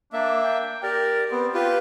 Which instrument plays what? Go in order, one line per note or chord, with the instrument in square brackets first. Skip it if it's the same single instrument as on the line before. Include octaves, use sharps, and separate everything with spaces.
[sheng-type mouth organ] A#3 E5 [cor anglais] D4
[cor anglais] G5
[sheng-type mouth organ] G4 D5 [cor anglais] A#4
[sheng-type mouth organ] B3 [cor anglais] C4
[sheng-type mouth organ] F4 G4 B4